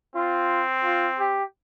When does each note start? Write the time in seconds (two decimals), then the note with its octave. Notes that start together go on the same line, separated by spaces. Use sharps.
0.15 C4 F4
0.84 F4
1.19 G4